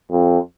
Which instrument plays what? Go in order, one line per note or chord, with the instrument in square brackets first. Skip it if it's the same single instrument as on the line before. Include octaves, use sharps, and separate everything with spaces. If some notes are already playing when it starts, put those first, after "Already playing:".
[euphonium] F2